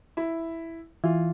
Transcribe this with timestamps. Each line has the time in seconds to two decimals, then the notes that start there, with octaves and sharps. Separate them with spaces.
0.17 E4
1.04 E3 F4